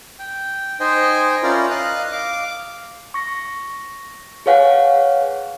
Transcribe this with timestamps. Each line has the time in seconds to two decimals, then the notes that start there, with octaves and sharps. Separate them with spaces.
0.19 G5
0.80 D#4 C5 D#5 G5 G#5
1.43 C#4 E4 F4 A#4 D5 A#5
1.70 D#5 F5 F#6
2.12 F5 D6
3.14 C#6 A#6
4.46 G#4 B4 C#5 F5 F#5 G#5